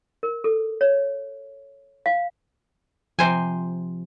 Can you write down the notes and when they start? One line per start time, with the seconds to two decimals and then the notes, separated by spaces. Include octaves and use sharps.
0.23 A#4
0.44 A4
0.81 C#5
2.06 F5
3.19 C3 F3 C5 G#5